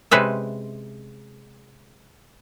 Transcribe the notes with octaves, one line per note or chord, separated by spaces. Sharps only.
C3 G#3 C#4 B4 C5 E5